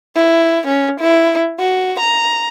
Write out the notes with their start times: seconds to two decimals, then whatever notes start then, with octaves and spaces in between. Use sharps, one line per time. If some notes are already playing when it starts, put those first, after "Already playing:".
0.15 E4
0.67 C#4
1.00 E4
1.59 F#4
2.00 A#5